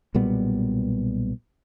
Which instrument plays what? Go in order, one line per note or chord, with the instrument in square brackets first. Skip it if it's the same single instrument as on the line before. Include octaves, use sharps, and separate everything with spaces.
[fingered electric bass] B1 A#2 G3 B3